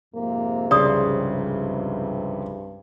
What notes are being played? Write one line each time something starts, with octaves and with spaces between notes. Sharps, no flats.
F2 G#2 C3 A#3
C2 G2 C#3 D5 C6 D#6